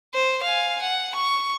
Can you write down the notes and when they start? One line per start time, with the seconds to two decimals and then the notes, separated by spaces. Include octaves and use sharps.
0.14 C5
0.43 F5 G#5
0.82 F#5
1.15 C#6